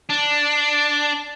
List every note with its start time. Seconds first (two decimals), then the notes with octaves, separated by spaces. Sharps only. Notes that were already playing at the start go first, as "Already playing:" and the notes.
0.09 D4